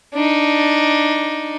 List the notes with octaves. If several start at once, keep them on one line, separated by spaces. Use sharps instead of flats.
D4 D#4